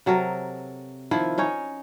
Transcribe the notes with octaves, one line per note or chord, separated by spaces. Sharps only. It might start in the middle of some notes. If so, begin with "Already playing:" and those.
C3 F#3 A4 A#4
D#3 F3 E4
C#4 D#4 C#5